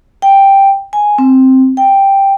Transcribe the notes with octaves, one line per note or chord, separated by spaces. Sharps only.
G5
G#5
C4
G5